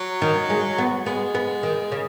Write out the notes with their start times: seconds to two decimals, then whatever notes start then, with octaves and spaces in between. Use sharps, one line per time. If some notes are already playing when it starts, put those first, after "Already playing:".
Already playing: F#3
0.22 D#3
0.50 G#3
0.78 B3
1.06 G#3 B3
1.35 B3
1.63 D#3
1.92 C#3